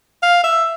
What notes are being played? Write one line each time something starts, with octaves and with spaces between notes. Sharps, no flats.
F5
E5